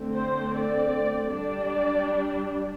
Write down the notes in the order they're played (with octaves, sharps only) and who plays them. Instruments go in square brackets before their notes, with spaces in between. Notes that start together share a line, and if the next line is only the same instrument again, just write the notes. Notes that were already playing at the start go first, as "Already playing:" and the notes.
Already playing: [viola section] D3 A3 C4
C5
D5
G3 D4 D5